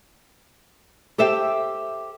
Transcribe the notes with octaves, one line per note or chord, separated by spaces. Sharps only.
G4 A4 C5 E5 F5 G5